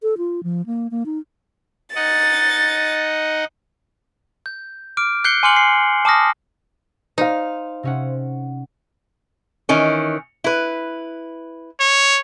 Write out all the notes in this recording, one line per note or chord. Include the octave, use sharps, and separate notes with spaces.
A4
F4
F3
A#3
A#3
D#4
D#4 D#5 F#5 A6
G6
D6 F6 D7
F#6 G6 C7 C#7 G7
G#5 C6 D6 F6 C#7 F#7
C7
A5 D6 D#6 F6 A#6
D#4 C5 F5
C3 C#4 F#5
D#3 E3 C#4
E4 B4
C#5